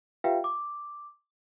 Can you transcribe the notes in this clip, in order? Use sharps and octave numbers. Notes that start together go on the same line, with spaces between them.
F4 G4 B4 E5 F5 G5
D6